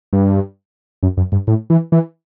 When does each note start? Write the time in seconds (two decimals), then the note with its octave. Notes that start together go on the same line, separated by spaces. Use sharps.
0.13 G2
1.03 F#2
1.17 F#2
1.32 G2
1.47 A2
1.70 E3
1.92 E3